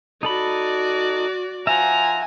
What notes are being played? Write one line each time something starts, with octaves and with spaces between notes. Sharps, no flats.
D#4 F#4 A4 D5 B5
F3 E5 F#5 G#5 A#5